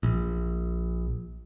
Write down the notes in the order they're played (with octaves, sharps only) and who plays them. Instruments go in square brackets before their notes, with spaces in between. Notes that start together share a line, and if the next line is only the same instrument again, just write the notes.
[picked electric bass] A#1